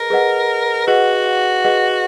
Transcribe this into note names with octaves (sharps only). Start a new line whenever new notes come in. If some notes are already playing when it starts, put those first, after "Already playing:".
Already playing: G#4 A#4 B4 D#5
G#4 B4 D#5 F#5
F#4 G#4 B4 D#5 F#5
G#4 B4 D#5 F#5